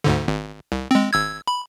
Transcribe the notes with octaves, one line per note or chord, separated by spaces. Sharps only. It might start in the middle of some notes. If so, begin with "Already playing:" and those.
D2 G#2 D3
G#1
C2
G#3 C4
G#1 E6 G#6
B5